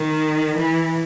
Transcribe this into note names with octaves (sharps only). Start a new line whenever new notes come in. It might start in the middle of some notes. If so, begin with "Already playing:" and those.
Already playing: D#3
E3